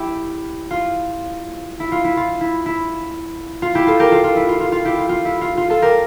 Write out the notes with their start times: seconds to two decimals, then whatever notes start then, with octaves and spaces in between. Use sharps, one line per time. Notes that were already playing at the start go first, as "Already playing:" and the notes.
Already playing: E4 G4
0.71 F4
1.80 E4
1.92 F4
2.04 E4
2.17 F4
2.41 E4
2.66 E4
3.62 F4
3.75 E4 G4
3.87 F4 A4
4.00 G4 A#4
4.11 F4 A4
4.24 F4
4.36 E4
4.49 F4
4.60 F4
4.72 F4
4.85 E4 G4
4.97 F4
5.09 F4
5.25 E4
5.41 F4
5.57 F4
5.70 F4 A4
5.82 G4 A#4